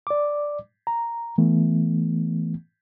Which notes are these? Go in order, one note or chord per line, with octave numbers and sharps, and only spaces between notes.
D5 D6
A#5
E3 A3 B3